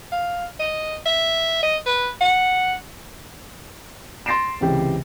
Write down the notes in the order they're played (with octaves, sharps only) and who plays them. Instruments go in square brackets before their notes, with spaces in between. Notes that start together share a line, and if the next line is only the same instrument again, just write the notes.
[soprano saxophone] F5
D#5
E5
D#5
B4
F#5
[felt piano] C6 A6 A#6 C7 D7 E7
C#2 C3 E3 G4 G5